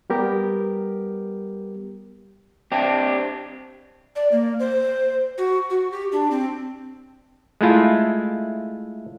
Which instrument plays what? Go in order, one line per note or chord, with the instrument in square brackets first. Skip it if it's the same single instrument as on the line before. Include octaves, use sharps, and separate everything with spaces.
[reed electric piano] G3 B3 G4 A#4
[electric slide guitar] C4 D4 G4
[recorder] D5
A#3
C5
F#4
F#4
G4
D4
C4
[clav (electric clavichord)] G#3 A3 E4 F4